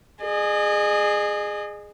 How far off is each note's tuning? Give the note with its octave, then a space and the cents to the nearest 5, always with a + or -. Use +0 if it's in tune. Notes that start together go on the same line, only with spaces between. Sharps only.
G#4 +0 D#5 -40